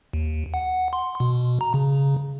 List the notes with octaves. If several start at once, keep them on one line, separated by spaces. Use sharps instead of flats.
D#2
F#5
C6
B2
A#5
C#3